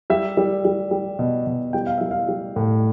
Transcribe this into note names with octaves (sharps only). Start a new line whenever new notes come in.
G3 E5
G3
G3
G3
B2
B2
G3 G5
F5
G3 E5
F5
G3
A2